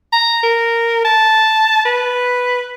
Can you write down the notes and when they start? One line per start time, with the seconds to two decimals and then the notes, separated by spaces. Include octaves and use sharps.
0.13 A#5
0.43 A#4
1.05 A5
1.86 B4